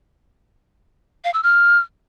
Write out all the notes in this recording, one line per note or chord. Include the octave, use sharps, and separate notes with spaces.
F5
E6
F6